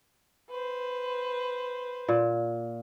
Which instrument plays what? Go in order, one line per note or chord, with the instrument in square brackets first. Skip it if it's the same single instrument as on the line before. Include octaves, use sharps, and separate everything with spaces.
[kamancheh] B4 C5
[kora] A#2